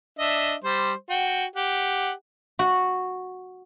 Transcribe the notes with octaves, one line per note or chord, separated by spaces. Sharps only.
D4 D#5 E5
G3 C5
F#4 G5
G4 F#5
F#4